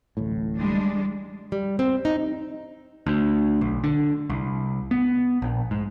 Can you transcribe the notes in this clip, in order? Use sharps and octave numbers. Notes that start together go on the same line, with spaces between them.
D1 A1 A2
G3 G#3 D4
G3
C4
D#4
D2
B1
D3
C2
B3
A#1
G#2